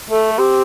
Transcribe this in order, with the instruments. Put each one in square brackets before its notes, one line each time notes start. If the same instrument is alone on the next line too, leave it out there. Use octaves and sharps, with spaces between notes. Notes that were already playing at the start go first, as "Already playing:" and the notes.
[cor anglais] A3 [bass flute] A4
[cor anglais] C4 [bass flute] G4